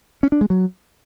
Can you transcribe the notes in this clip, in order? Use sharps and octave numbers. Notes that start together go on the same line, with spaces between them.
C#4
D4
G#3
F#3